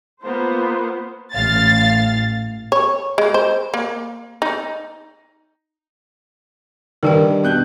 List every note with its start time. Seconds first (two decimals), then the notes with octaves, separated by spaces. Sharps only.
0.22 A#3 B3 F4 C5
1.35 A1 F5 A6
2.72 C#5
3.18 G#3
3.34 C5
3.74 A#3
4.42 D#4
7.03 G2 D#3 A#4 B4 G5
7.44 B2 F#6 G6